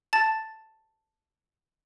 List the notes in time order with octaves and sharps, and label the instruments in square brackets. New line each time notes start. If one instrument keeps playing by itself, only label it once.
[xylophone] A5 A6